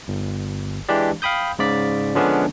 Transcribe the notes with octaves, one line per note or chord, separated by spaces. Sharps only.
G1
E3 G#3 D4 G4 D5
F5 G5 B5 D#6 G6
G#2 C#3 D5 B6
D3 F3 G#3 B3 C#4 D4